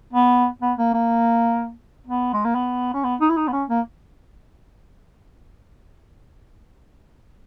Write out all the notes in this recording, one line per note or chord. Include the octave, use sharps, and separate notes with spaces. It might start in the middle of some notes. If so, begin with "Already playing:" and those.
B3
B3
A#3
A#3
B3
G#3
A#3
B3
C#4
B3
D#4
E4
D#4
B3
C#4
A#3